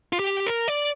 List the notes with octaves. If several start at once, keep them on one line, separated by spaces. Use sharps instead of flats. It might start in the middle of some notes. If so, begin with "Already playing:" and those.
F4
G4
A#4
D5